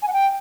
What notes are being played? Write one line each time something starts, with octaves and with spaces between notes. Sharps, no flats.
G#5
F#5
G5